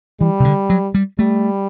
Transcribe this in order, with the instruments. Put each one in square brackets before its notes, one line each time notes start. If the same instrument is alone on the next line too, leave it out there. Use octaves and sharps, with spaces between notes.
[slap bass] E3 [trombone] G3
[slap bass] C3
D3
F#3
G3
[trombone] G3 [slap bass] A3